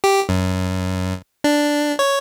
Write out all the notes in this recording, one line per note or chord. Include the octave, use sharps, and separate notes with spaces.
G4
F#2
D4
C#5